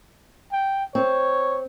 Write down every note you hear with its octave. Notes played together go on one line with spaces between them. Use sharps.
G5
C4 C#5